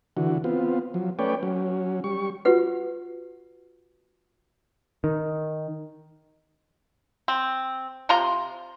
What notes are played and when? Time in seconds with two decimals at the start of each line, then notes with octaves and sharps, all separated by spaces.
0.17 D3 E3 F#4
0.44 B3 C4 F4
0.94 F3 F#3
1.19 A3 C#4 B4 C#5 D5 G5
1.43 F#3 C#4
2.04 G3 C#6
2.45 F4 F#4 B4 F#5
5.04 D#3
7.28 C4
8.09 C3 F4 A#5 C6